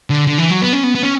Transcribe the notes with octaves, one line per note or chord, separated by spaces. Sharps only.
D3
D3
E3
F#3
B3
C#4
B3
B3
C#4